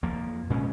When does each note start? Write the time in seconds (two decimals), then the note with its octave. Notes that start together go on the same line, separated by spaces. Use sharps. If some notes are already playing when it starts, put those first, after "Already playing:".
0.03 F2 F3 A#3
0.50 A#2 G#3 C#4